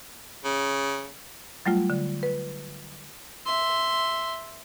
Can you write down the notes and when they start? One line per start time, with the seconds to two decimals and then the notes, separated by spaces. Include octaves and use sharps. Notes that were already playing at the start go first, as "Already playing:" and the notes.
0.44 C#3
1.66 F#3 G3 A3 F4
1.90 D3
2.23 B4
3.46 E5 C6